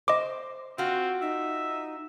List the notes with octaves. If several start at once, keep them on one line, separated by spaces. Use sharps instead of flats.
C5 D#5 D6
C4 F4 F#4
D#4 E5